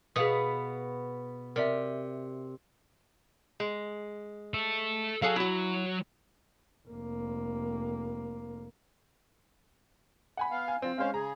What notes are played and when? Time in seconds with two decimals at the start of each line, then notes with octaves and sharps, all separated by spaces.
0.16 B2 B3 G#4 F5 D#6
1.56 C3 A#4 D5 E5
3.60 G#3
4.54 A4 E5
5.22 F#3 G#4 A4 F5
5.36 E4 F#4
6.88 F1 A#3
10.37 F#5 G#5 B5
10.51 B3 F5
10.68 G#5
10.82 F3 C4 F4
10.98 G#3 C#4 C5 F5
11.14 C#3 G#4 A#5